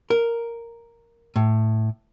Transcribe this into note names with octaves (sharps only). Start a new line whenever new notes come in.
A#4
A2